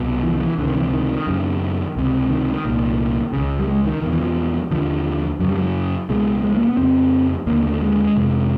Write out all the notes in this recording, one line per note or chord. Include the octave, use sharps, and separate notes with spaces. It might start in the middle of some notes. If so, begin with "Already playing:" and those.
Already playing: C2 B2
E3
D#3
E3
C#2 C3 D3
D#3
E3
D#3
F#2 C#3
C#2 C3
D#3
C2 A#2
C#2 C#3
G3
G#3
D#3
E2 B2 D#3
E3
F3
D#2 D3 F3
F#2 C#3 F#3
G3
F#3
C#2 B2 G#3
G#3
A#3
B3
F2 C#3 C4
D#2 D3 A#3
A3
G#3
F2 C3